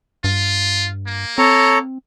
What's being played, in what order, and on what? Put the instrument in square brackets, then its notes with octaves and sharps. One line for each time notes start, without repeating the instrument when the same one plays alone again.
[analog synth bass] G2 [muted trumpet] F4
[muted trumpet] A#3
[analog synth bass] C4 [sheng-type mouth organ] A4 C#5 A#5